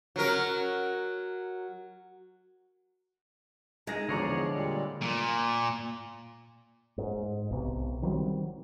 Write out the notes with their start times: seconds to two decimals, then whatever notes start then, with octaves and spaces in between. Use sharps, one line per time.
0.16 F#3 A#4
3.87 G#3 D#4 A#5 A#6
4.09 E2 D3 F3 G#4 C#5 D5 A#5
4.55 A#2 G3
5.02 A#2
6.98 G#2
7.51 B1 C3
8.02 D#3 F#3 G3 C4